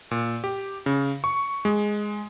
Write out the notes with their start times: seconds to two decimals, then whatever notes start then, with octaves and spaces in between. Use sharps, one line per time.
0.11 A#2
0.44 G4
0.86 C#3
1.24 C#6
1.65 G#3